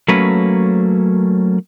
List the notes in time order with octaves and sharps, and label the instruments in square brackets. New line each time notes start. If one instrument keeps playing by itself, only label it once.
[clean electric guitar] F#3 A3 A#3 C#4 B4